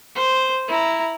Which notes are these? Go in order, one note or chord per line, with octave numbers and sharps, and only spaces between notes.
C5
E4 A#5